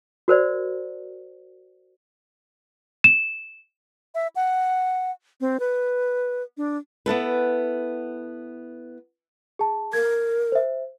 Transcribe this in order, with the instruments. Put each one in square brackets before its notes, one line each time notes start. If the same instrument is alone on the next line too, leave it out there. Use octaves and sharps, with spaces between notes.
[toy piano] F#4 A#4 C5 D5
[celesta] E7
[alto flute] E5
F#5
C4
B4
D4
[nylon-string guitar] B3 E4 A4 B4
[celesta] G#4 A5
[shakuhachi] A#4 [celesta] G#6
[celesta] C5 E5